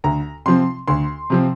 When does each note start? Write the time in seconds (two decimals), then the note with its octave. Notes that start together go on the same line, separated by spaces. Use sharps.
0.04 D2 A#5
0.46 C3 F3 C4 C6
0.88 D2 C6
1.30 C3 F3 C4